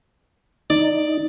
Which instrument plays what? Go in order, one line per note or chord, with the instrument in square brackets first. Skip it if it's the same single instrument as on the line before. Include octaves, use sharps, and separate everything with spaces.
[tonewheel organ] D#4 [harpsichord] D5